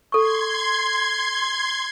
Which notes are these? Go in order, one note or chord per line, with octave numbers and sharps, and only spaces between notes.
A4 C6 C#6 G#6